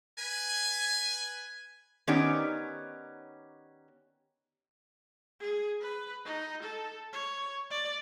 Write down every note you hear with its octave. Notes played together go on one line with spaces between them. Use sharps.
B4 G#5
D#3 B3 C#4 D#4 G4 D5
G#4
B4
D#4
A4
C#5
D5